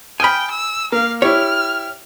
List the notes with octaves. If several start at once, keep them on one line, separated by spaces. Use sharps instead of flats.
G5 G#5 B5 D#6 F6
E6
A#3 F5
E4 G4 C#5 F6